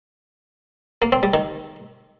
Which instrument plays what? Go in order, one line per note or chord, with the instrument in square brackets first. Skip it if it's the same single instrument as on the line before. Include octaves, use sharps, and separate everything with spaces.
[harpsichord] A#3
C4
G3
D#3